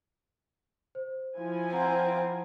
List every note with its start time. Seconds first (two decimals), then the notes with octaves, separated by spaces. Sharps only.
0.95 C5
1.37 F3 E4 G#5
1.73 C4 F#5 A#5